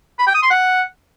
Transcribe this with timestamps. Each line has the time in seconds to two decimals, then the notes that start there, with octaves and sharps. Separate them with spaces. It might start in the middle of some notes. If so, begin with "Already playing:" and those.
0.19 B5
0.27 G5
0.35 D#6
0.43 C6
0.51 F#5